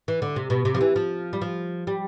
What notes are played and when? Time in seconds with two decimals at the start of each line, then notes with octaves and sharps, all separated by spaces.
0.08 E3
0.22 D3
0.36 C3
0.50 B2
0.65 C3
0.75 F3
0.81 E3
0.96 F3
1.33 G3
1.42 F3
1.87 G3